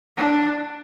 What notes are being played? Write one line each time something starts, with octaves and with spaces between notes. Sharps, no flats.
D4